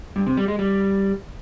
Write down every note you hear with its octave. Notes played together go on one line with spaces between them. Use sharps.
G2
C3
G3
G#3
G3